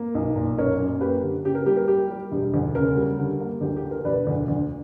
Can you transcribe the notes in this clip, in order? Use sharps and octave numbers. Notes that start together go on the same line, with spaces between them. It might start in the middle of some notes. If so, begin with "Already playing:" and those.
Already playing: A#3
B1
A#2
F#2 A#4 C#5
F#2
A#3 G4 B4
D3
C#3 G4
A#4
G3 G4
A#4
G3 G4
G3
E1
D2
C#3 A#4
G3
D3
A#3
D2 G4
G4
D3
A#4
E1 B4 D5
D2
D2